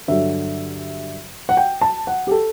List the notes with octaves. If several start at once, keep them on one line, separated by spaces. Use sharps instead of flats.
G2 D3 F#3 E5
F#5
G5
A5
F#5
G4
A4